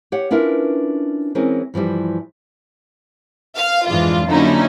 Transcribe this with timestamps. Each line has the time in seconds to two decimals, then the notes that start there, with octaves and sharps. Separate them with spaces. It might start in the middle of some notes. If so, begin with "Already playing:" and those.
0.12 G4 C#5 F#5
0.31 C#4 D4 E4 F4 A#4 B4
1.35 E3 G#3 C4 C#4 G#4 A#4
1.74 G2 E3 F3 G3
3.57 F5
3.89 F2 G#2 E3 G#3 D4 F4
4.26 D3 F#3 A#3 C#4 D#4 E4